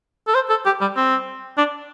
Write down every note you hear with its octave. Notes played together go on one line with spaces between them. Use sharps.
A4
C5
A4
G4
G3
C4
D4